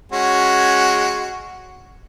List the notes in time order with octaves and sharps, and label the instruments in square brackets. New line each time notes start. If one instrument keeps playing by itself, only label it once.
[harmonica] G#3 C#4 F#4